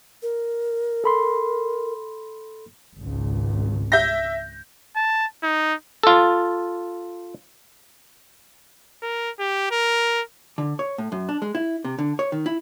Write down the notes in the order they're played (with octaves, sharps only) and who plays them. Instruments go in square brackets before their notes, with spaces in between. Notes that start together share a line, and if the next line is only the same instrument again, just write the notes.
[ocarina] A#4
[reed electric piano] A4 B5 C6
[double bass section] G#1 C#2
[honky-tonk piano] E5 G6 A#6
[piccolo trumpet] A5
D#4
[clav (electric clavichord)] F4 A4
[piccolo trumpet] A#4
G4
A#4
[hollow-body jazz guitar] D3
C#5
A2
F#2
D4
G#3
E4
C3
D3
C#5
D#3
E4